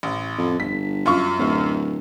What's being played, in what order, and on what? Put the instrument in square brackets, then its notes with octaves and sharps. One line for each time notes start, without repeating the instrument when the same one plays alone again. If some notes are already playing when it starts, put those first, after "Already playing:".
[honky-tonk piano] A1
[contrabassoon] F2
[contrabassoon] G1 [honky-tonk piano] B6
[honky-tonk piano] F#2 F4 C#6
[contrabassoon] D1